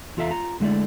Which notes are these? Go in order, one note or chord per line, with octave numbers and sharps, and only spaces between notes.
E2 F4 A4 E5 F5 A#5
F4 A#5
D3 G#3 A3 E4 D5